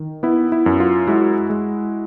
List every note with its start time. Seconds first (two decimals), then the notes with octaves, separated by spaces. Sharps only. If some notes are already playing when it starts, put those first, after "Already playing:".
Already playing: D#3
0.23 B3 E4
0.52 E4
0.66 F#2
0.80 F4
1.07 G#3 E4 F#4
1.50 G#3